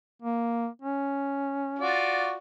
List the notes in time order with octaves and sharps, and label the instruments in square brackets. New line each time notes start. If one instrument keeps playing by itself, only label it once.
[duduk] A#3
C#4
[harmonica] F4 F#4 D5